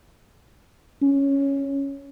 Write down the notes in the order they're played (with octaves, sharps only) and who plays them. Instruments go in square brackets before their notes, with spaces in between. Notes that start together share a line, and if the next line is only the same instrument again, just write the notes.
[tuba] C#4